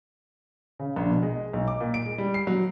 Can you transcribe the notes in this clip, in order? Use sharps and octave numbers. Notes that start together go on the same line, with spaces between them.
C#3
A#1
B2
G#3
B1
D6
A#2
D7
G#3
G3
C7
F#3